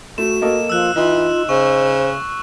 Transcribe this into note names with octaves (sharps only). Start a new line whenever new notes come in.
A3 F#4 E7
A#3 A4 D#5
F3 E6 F#6
E3 D#4 F4
C#3 C5 C#6